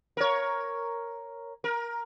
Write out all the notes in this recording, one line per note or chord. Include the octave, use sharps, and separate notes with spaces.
A#4 C#5
A#4